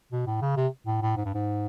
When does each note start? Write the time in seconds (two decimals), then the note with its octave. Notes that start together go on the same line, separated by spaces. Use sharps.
0.12 B2
0.27 A2
0.41 C#3
0.57 C3
0.87 A2
1.02 A2
1.17 G#2
1.25 G2
1.34 G#2